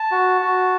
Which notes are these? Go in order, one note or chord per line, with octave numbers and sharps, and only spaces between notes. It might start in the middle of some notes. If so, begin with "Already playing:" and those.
Already playing: A5
F#4
F#4